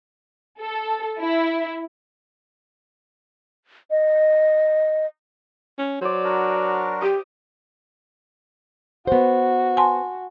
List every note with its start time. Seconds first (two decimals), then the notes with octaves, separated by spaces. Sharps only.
0.60 A4
1.19 E4
3.91 D#5
5.78 C#4
6.01 F#3 C5 D5
6.24 D4 F#4 A#4
7.02 G4 D#6
9.07 B3 F#4 C5
9.77 G#5 A5 C6